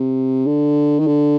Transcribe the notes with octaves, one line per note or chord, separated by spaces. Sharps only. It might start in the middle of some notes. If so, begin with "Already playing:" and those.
Already playing: C3
D3
D#3
D3